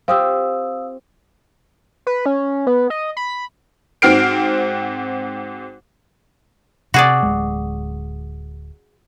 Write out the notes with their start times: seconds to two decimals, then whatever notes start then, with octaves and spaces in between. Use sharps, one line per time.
0.08 C4 F4 G4 F5 D#6 E6
2.07 B4
2.26 C#4
2.67 B3
2.90 D#5
3.17 B5
4.02 G#2 C4 F#4 F6 C7 D7
6.94 C3 F#4 G#4 D5
7.23 D1 G#3